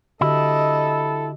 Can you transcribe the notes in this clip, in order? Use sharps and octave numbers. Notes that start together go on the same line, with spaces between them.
D3 E4 F#4 G4 A4 D#5